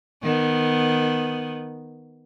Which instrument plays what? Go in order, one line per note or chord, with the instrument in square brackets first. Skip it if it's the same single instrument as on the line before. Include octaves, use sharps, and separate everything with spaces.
[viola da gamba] D#3 B3